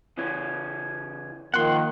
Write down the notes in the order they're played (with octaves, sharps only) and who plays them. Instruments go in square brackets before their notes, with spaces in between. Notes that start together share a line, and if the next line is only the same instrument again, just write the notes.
[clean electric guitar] C#3 E3 C#4
[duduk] D#3 [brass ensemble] F3 A#3 [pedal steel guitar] F#5 C6